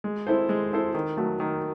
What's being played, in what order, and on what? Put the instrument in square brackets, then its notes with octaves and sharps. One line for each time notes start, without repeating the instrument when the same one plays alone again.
[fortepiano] G#3
C4 E4 A4 C5
G#3
C4 E4 A4 C5
D#3
F#3 A3
D#3